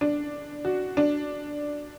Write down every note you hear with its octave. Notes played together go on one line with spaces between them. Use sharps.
D4
F#4
D4